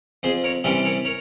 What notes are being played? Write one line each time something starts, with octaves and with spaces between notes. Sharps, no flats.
F2 G#4 C5
A#4 C#5
C3 E3 G3 C#4 G4 A#4
A#4 C#5
A#4 C#5